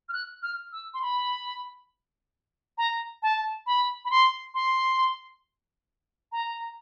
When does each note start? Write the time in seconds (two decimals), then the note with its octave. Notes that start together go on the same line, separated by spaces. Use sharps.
0.09 F6
0.13 F#6
0.42 F6
0.72 E6
0.94 C6
1.02 B5
2.78 A#5
3.22 A5
3.66 B5
4.05 B5
4.11 C6
4.54 C6
6.32 A#5